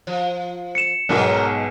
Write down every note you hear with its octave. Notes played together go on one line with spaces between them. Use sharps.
F3
C#7 E7
B1 G#2 B2 F#3 A#4